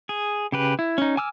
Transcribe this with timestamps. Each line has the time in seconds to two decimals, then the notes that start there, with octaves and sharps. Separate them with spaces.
0.09 G#4
0.52 C#3 G4 B4
0.79 E4
0.98 C#4 D#4
1.17 G#5 D6 E6 F6